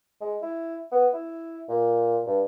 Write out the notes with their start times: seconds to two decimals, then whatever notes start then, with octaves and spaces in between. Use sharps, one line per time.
0.21 G#3
0.42 E4
0.92 B3
1.13 E4
1.69 A#2
2.26 G2